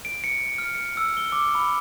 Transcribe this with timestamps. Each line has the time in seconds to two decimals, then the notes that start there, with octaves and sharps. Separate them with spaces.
0.05 D7
0.24 C#7
0.58 F6
0.75 C#7
0.97 E6
1.17 G7
1.32 D6
1.55 B5